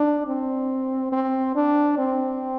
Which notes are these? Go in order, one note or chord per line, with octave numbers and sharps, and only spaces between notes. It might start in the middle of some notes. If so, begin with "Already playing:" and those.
Already playing: D4
C4
C4
D4
C4